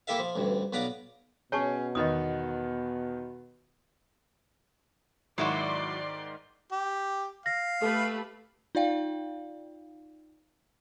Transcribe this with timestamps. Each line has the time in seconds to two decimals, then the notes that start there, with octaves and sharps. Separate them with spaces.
0.07 A#3 E4 G4 A4 E5 F5
0.19 F3
0.36 A1 D2 G2
0.73 B1 B3 B4 D5 F5 A#5
1.52 B2 C#4 G#4 C#5 A5 C#6
1.95 E2 D#3 B3 D#5 D#6
5.38 G#2 D#3 F#3 E4 F#4 D5 C6
6.72 G4
7.46 F5 A#6
7.82 A3 G4 A4 B4
8.75 D#4 F4 D5 F5 G5